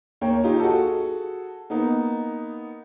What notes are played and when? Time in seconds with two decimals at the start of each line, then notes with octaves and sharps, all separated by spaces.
0.21 D#2 A#3 C#5 G5
0.44 D#4 F4 G4
0.60 F#4 G#4 A4
1.70 A#3 B3 D#4